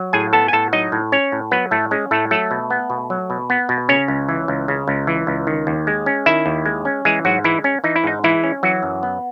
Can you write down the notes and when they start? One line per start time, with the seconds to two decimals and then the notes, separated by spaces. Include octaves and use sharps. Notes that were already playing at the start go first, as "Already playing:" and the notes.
Already playing: F#3
0.13 A2 G#4 G#5
0.33 B3 A4 A5
0.48 G#5
0.53 A2 A4 A5
0.73 F#3 D#4 D#5
0.92 A2
1.12 C#4 C#5
1.32 A2
1.51 F#3 B3 B4
1.71 A2 A3 A4
1.91 G#3 C#4 G#4
2.11 A2 A3 A4
2.31 F#3 A3 A4
2.51 B2
2.70 B3
2.90 B2
3.10 F#3
3.30 B2
3.50 B3
3.69 B2
3.89 C#3 C#4 C#5
4.08 C#2
4.29 E3
4.48 C#2
4.68 C#3
4.88 C#2
5.07 E3
5.27 C#2
5.47 D#3
5.67 D#2
5.87 G#3
6.06 C#4
6.26 D#3 E4 E5
6.46 D#2
6.66 G#3
6.85 C#4
7.05 E3 G#3 G#4
7.25 G#2 F#3 F#4
7.44 E3 G#3 E4
7.64 C#4
7.84 E3 D#4
7.96 E4
8.04 G#2 D#4
8.23 E3 G#3 E4
8.44 C#4
8.63 E3 F#3 F#4
8.83 F#2
9.03 B3